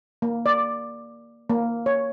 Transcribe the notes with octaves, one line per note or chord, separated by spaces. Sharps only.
A#3
D5
A#3
C#5